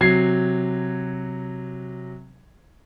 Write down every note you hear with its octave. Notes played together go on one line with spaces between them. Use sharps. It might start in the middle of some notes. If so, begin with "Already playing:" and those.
C3 F#3 G#6 C7